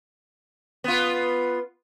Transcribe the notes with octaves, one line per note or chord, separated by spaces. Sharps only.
B3 F4